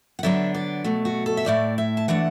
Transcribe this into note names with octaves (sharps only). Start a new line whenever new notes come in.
F#5
D3 F#3 B3 D4 E5
D5
B2 F#3 A3
F#4
A4
E5
A2 A3 E4 D5
E5
A5
E3 A3 D4 F#5